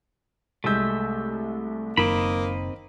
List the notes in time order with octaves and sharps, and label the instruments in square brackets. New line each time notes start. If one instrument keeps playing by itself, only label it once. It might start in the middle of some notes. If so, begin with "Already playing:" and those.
[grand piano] C2 G#3 G6 [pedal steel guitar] A3 E5
[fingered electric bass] F#1 [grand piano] D#3 D7 E7 [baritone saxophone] A#3 [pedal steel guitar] C4 D#5 B5